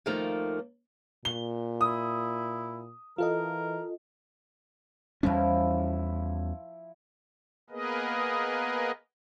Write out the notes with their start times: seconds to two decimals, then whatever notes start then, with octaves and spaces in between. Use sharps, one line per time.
0.06 D#2 D#3 F3 A3 A#3 A#5
1.25 A#2 G7
1.81 E4 D#6
3.18 E3 F4 A4 A#4 D#5
5.23 E2 F3 G3 C#4 E4
7.70 A#3 B3 G#4 A#4 B4 D#5